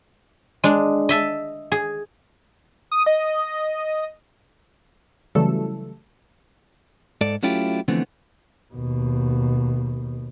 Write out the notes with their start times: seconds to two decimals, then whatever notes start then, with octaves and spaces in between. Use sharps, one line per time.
0.64 G#3 D4
1.09 D#5 E5 A5
1.72 G#4
2.91 D#6
3.06 D#5
5.35 C#3 E3 F#3 G3 A3 A4
7.21 G#2 A4 D5
7.43 F#3 A3 C#4 E4 F4 G4
7.88 D3 E3 F3 A3 B3 C4
8.74 D#2 B2